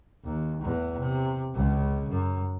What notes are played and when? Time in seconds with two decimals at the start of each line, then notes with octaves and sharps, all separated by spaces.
0.24 D#2
0.62 E2 A2
0.99 C3
1.54 C#2 C#3
2.09 F#2